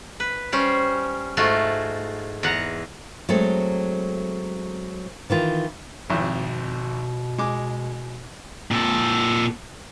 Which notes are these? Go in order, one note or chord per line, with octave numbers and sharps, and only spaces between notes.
B4
G3 C#4 C5
G#2 A3 F4 F#4 C6
E2 F#5 A#5
F#3 G#3 A3 C4 A4
D#3 E3 F4
G#1 F2 B2 E4
G#3 D6
A#2 A4